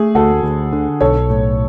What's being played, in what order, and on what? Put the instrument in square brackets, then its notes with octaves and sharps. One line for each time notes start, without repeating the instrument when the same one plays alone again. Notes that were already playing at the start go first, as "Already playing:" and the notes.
Already playing: [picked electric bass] A3 [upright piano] G#4
[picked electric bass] D2 [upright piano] F#4 A4
[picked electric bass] D2
D3
[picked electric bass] B1 [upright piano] A4 C#5
[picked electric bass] A2